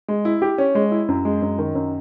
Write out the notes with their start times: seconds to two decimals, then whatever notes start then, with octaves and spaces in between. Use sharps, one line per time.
0.08 G#3
0.25 E4
0.42 G4
0.58 C#4
0.75 G#3
0.91 E4
1.08 F#2
1.25 G#3
1.42 F#2
1.58 D#3
1.75 F#2